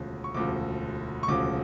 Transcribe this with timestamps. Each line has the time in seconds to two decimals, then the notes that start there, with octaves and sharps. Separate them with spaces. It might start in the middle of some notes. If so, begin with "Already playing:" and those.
Already playing: E1 D2 C#3 F3
0.24 C#6
0.34 E1 D2 C#3 F3 D6
1.23 C#6
1.28 E1 D2 C#3 F3 D6